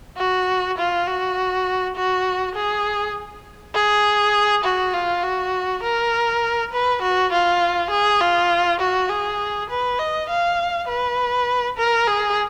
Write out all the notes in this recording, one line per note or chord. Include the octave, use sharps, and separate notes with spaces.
F#4
F4
F#4
F#4
G#4
G#4
F#4
F4
F#4
A#4
B4
F#4
F4
G#4
F4
F#4
G#4
B4
D#5
F5
B4
A#4
G#4